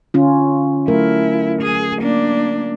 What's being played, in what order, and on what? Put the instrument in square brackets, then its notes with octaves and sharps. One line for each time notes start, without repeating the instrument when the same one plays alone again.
[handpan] D3 C#4 F4
[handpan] F#3 A3 A#4 [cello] E4
[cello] G#4
A#3 D4